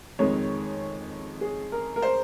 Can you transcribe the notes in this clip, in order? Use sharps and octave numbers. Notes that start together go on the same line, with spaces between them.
F2 D#3 G#3 C#5
G#4
A#4
A#4
C5